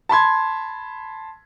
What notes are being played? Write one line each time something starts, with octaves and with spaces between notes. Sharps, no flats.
A5 B5 C6 G#6